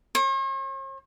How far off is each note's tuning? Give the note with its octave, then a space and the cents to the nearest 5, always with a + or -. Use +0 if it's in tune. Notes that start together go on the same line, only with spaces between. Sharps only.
C#5 -45